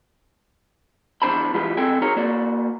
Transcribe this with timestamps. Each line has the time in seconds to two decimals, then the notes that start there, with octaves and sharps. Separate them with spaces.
1.22 E2 A#3 D4 C5 A5 B5
1.54 E3 G#3 F4 G4 B4
1.77 C4 A4 G5 G#5
2.02 D#4 F#4 G#4 A#4 C#5 A#5
2.16 A#3 F#4 D5